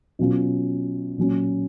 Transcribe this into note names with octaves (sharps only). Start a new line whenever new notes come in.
B2 F#3 C#4 F4
A#2 F#3 C#4